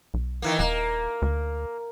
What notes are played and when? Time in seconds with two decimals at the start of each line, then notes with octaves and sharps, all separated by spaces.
0.14 B1
0.42 D#3 E3 A#3
0.59 D#1 A#3
1.22 D2